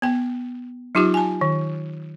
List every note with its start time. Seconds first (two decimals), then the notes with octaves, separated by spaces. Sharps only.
0.02 B3 G5
0.95 F#3 D#4 F4 G4 D6
1.14 G#5 A5
1.41 D#3